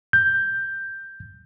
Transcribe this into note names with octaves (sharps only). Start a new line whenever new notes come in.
G6